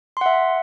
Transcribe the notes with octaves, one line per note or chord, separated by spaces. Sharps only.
E5 F#5 C6